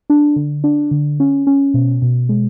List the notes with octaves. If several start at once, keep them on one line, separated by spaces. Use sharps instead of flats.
D4
D3
D4
D3
C#4
C#4
B2
B2
G#3